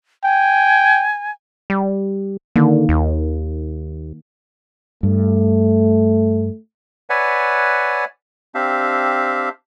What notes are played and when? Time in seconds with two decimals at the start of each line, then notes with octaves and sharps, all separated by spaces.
0.24 G5 G#5
1.70 G3
2.56 D3 D#3 A#3
2.89 D#2
5.03 G2 A3
7.10 B4 C#5 D5 E5 F#5 G#5
8.55 C4 D4 G4 E5 F5